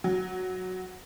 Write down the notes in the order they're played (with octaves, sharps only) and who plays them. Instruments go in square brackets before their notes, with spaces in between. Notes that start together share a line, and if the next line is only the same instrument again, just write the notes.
[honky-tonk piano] F#3